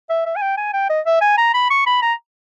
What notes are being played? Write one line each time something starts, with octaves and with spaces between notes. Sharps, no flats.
E5
E5
G#5
G5
G#5
G5
D#5
E5
G#5
A#5
B5
C#6
B5
A#5